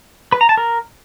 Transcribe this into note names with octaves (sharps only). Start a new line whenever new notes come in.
B4
A#5
A5
A#4